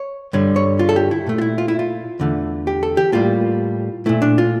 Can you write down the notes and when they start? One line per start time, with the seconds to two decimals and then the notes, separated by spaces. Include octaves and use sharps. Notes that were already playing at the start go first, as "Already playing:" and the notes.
Already playing: C#5
0.33 G2 D3 G3 C#5
0.56 C#5
0.79 F4
0.89 A4
0.96 G4
1.11 E4
1.27 A#2 A3
1.38 F4
1.42 E4
1.58 F4
1.68 E4
1.79 F4
2.20 E2 D3 A3
2.67 G4
2.83 A4
2.97 G4
3.12 A2 G3 A#3 F4
4.06 A#2 A3 E4
4.22 D4
4.38 F4